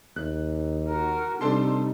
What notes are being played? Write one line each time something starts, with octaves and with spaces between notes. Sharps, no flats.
D#2 F#6
F#4 A#4
C3 G3 D4 D#4 A4 C6